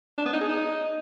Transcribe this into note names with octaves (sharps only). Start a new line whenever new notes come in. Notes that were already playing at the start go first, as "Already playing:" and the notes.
D4
B3
D#4
G#4
D#4